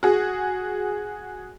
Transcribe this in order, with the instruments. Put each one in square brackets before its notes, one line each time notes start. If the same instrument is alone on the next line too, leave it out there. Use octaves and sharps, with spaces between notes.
[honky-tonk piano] F#4 G#4